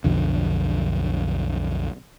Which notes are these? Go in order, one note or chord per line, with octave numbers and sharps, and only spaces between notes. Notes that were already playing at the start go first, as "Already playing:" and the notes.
B1 F2 D3